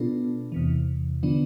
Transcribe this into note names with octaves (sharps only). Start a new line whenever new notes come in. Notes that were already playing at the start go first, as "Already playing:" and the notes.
Already playing: B2 B3 D4 F4 A4
E2 C3 E3
D3 F3 B3 D4